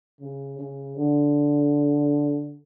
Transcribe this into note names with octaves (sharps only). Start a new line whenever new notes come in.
C#3
C#3
D3